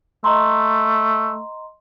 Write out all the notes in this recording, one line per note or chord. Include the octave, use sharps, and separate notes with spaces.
A3 D#5 A#5 C6